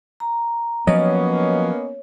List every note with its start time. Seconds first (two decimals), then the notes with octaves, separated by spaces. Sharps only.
0.20 A#5
0.87 F3 F#3 A#3 B3 C#4 C#5 D#5